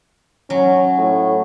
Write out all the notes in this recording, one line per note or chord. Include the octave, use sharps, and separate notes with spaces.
F#3 C#4
A2